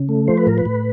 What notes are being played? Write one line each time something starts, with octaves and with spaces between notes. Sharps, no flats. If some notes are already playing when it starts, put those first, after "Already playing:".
Already playing: C#3
A3
F3 C5
B4
A2 A#4
B4
A2